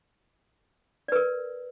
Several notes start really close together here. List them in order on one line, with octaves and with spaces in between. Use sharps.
D5 B4 A#4